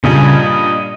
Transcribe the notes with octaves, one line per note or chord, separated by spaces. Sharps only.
G2 A#2 C#3 G3 D#5 G#5
D#5